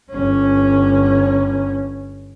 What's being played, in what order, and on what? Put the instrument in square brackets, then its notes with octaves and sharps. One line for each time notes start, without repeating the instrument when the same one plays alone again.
[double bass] G1 C#4